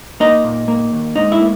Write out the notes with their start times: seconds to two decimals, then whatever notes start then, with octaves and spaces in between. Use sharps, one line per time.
0.20 A#3 D#4 D#5
0.44 A#2
0.68 A#3
0.92 D#2
1.16 G#2 D#4 D#5
1.32 E4 E5
1.40 A#3